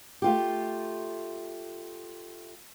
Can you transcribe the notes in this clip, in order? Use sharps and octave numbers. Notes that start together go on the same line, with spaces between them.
A3 F4 G4